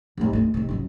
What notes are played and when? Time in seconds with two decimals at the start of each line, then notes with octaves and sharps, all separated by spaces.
0.18 C2 G#2
0.33 D2 G#3
0.54 G#2 C3
0.69 C#2 F#3